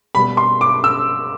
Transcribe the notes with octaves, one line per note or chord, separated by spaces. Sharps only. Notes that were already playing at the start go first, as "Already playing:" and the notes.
B2 G3 B3 B5
C6
D6
E6